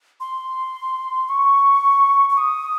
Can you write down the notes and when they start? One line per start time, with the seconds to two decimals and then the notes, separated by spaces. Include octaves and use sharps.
0.20 C6
1.29 C#6
2.29 C#6
2.37 D#6